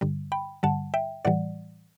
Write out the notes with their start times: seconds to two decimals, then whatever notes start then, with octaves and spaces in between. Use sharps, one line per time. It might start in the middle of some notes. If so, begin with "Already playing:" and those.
0.01 G2 D3 G3
0.32 G5 B5
0.63 G2 D3 G3 F#5 A5
0.94 E5 G5
1.25 A2 E3 G3 D5 F#5